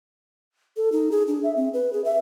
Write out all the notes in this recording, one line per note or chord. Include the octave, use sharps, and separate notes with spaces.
A4
D#4
G#4
D4
E5
C4
B4
G#4
E5